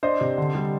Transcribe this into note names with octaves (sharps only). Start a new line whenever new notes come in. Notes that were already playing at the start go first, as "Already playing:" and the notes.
D4 C5 D#5
C3
D3
G3